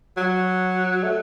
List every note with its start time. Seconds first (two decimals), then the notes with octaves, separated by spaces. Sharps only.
0.17 F#3
1.03 A3